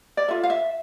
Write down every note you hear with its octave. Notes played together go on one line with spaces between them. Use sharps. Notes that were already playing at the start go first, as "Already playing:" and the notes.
D5
F4 A4 E5
F5
E5